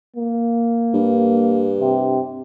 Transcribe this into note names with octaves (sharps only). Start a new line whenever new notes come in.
A#3
G2
C3